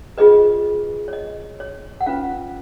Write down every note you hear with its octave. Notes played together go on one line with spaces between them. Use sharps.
F4 G#4 B4 D#5
C#5
D#5
C#5
F#5
C#4 F4 B4 F5